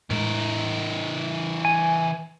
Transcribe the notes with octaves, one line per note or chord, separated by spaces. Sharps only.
A2 E3 G#3 A#4
G#5